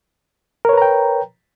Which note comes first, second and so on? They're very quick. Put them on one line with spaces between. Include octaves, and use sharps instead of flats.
A#4 C#5 B4 A#5 G5